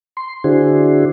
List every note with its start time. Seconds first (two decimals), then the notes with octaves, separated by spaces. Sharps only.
0.17 C6
0.44 D3 D4 E4 F#4 G#4 C5